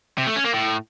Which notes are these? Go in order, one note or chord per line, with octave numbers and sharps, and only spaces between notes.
C3
A3
C#4
A#3
A2